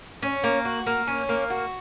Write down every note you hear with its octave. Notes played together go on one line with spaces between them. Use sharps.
C#4
A#3
F#4
A#3
C#4
A#3
F#4